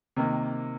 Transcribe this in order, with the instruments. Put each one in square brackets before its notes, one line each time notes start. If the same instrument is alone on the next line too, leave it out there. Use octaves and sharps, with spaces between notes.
[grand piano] C3 D#3 A#3